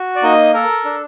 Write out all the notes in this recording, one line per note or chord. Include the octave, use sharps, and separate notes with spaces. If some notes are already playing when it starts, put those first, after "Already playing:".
Already playing: F#4
D5
A#3 D#4 D#5
A4 A#4
D4